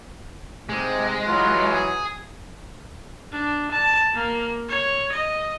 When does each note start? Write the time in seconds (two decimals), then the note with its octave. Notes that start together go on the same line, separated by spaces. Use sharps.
0.69 G#2 C3 G#3
1.27 E3 F#3 F4
1.74 G#4
3.33 D4
3.72 A5
4.15 A#3
4.69 C#5
5.12 D#5